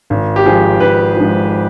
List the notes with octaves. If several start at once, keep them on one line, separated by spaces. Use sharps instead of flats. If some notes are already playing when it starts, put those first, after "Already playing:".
G#1
G4
G#2 F3 G#4
G#1 B4
G#2 F3